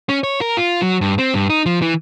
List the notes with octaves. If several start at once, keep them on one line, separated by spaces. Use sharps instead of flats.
C#4
C#5
A#4
F4
F#3
G2
C4
G2
D#4
F3
E3